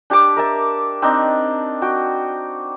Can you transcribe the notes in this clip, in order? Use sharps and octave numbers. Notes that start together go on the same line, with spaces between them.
D4 G4 A5 D6
A#4 E5 A5
C4 D4 D#4
F#4 G5